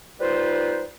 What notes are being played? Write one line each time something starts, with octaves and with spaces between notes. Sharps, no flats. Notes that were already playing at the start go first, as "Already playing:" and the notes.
G3 D#4 F4 B4 C5